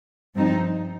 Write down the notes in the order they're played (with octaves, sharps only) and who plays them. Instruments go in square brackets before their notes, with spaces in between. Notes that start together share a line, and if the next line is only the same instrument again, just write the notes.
[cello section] G2 F3 C4 D#4